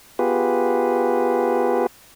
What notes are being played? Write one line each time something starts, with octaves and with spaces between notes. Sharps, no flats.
B3 F4 G4 G#4 B4